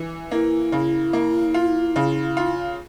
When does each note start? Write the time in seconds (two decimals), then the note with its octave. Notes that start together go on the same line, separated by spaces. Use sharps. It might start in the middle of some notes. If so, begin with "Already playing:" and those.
Already playing: E3
0.31 A#3 E4
0.72 C#3
1.13 A#3
1.54 F4
1.96 C#3
2.37 F4